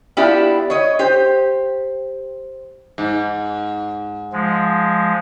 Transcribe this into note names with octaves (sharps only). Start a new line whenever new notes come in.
B3 D4 E4 F4 G4
C#5 D#5
G4 C5
G#2
F3 G#3